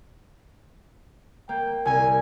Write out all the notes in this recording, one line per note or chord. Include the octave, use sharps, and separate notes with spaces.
A#3 G5
C2 G#5